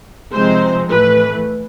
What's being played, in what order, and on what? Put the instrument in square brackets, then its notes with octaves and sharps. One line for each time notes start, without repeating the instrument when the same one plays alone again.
[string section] C3 F3 G#3 C4 D#4 [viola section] C5
[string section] A2 E3 A3 [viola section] B4